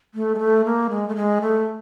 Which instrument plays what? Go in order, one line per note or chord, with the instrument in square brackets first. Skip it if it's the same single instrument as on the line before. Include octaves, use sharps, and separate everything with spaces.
[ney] A3
G#3
A3
A#3
G#3
A3
G#3
A3